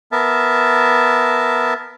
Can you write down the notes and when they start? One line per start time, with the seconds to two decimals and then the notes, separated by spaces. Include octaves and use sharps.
0.12 B3 A#4 E5 A5